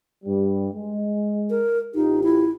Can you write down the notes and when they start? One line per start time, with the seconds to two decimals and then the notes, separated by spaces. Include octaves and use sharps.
0.25 G2 G3
0.73 G#3
1.50 A#4
1.95 A1 D#4 F4 G4
2.24 E4